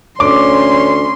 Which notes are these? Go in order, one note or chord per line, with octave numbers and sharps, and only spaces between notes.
D2 C#4 C#5 C6 D6